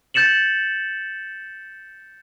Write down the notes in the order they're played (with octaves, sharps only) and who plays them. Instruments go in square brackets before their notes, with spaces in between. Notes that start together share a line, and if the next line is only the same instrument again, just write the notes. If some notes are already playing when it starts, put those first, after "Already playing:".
[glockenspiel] G6 A6 C#7 E7 F#7